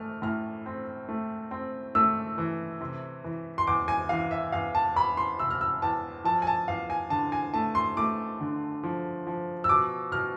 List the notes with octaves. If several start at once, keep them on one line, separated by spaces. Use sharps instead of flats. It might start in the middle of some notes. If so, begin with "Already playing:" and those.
Already playing: A3 F6
A2 F6
C4
A3
C4
A3 E6
E3
C3
E3
C6
E2 D6
G#5
E3 F5
E5
E2 F5
A5
E2 B5
C6
C3 E6
F6
E6
E2 A5
F3 A5
G#5
A5
E2 F5
G#5
D3 A5
G#5
A3 A5
C6
A3 D6
D3
F3
F3
E6
B2 D6
B2 F6